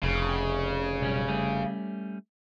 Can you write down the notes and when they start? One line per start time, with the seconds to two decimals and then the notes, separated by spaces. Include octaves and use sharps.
0.03 F1 C#3
1.01 B1 G3 C#4
1.28 G3 A3 C#4